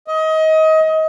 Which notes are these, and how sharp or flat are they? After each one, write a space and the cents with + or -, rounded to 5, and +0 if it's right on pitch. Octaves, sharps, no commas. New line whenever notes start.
D#5 +25